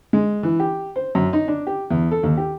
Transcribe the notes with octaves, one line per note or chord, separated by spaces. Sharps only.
G#3
E3
G4
C5
F#2
D#4
D4
G4
E2
A4
D#2
G4